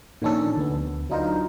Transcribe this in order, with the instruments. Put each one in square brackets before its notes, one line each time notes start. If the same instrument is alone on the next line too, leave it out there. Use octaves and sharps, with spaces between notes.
[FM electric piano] A#2 D#3 F3 C#4 D4 A4
D2 B3
F#3 D4 D#4 F4 A#4 C5